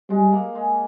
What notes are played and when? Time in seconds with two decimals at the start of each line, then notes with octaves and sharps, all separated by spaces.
0.10 G3 G#3
0.32 A#3
0.55 G#3